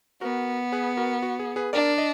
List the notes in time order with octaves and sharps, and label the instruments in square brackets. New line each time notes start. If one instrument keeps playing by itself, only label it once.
[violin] B3 [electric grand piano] F#4 A#4
[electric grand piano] G#4 B4
F#4 A#4
F#4
G#4
G#4 B4
[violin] D4 [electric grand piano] A#4 D5
[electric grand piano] D#5